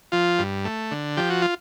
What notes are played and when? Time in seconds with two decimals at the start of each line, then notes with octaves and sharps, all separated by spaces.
0.12 F3 F4
0.39 G2
0.65 A3
0.91 D3
1.17 F3 G4
1.30 F#4
1.42 F4